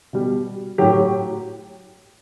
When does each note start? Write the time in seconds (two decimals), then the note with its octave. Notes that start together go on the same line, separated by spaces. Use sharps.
0.13 B2 G3
0.78 A2 F#3 G4